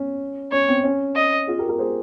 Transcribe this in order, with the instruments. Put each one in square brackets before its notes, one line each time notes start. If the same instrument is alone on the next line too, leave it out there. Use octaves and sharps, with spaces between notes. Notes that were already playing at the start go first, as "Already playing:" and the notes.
Already playing: [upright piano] C#4
[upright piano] C#4 [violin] C#5
[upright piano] C4
C#4
[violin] D#5
[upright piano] F4 G#4
G4 A#4
G4 A#4
G#4 C5